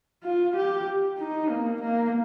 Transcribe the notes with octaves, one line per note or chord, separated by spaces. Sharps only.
F4
G4
D#4
A#3
A#3